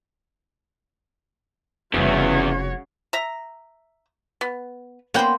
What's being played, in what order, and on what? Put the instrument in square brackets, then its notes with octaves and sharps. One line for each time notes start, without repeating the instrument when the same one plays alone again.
[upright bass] F1 G3 [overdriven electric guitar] E2 [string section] C#3 [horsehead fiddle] F#4 C#5
[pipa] E5 A#5
B3
[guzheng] A#3 B3 C5 [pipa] C#4 F#5 G5